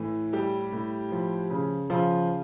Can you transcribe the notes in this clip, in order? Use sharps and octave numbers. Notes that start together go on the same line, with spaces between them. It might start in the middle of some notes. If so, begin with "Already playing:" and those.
Already playing: A2 E3
G3 G4
A2
F3
C#3
C#3 F3 F4